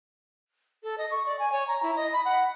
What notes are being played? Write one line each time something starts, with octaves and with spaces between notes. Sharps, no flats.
A4
D#5
C#6
D5
G#5
C#5
A#5
E4
D#5
B5
F#5